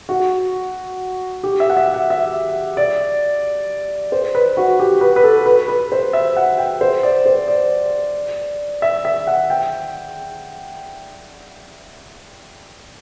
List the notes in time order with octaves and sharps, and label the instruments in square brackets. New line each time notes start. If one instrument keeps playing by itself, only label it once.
[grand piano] F#4
G4
E5
F#5
E5
F#5
E5
D5
C5
B4
F#4
G4
B4
B4
A4
B4
B4
C5
E5
F#5
G5
C5
D5
C5
D5
E5
E5
F#5
G5